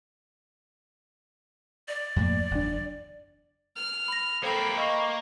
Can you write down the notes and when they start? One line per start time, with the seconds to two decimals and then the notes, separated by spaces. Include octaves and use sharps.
1.88 D5
2.16 F2 A2 A#3
2.51 F#1 E2 D4
3.76 F6
4.08 B5 A#6
4.43 A#3 C4 A4 C5 G5 B5
4.77 A#3 D#5 C#6